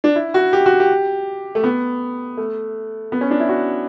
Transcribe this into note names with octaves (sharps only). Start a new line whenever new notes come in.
D4
E4
F#4
G4
F#4
G4
A3
B3
A3
B3
C#4
D4
E4
F#4